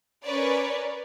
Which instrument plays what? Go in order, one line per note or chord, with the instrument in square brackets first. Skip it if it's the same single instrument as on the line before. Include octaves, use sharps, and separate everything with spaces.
[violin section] C#4 A#4 B4 C#5 D5